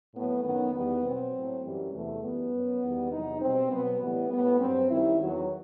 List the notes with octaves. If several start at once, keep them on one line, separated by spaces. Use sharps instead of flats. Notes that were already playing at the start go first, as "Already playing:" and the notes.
A2 F#3 B3
F#2 D#3 F#3 B3
E2 D#3 G3 B3
B2 F#3 C4
A2 F#3
F#2 E3 G3
E2 C3 E3 G3 A3
F#2 E3 G3 B3
F#2 F#3
E2 D#3 G3
E2 C3 F#3 D#4
B2 G3 C4
B2 F#3 B3
A2 E3 G3 B3
A2 G3 B3
G2 F#3 C4
F#2 D#3 G3 E4
E2 D#3 F#3